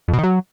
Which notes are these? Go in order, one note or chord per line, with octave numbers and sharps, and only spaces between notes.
F2
B2
D#3
F#3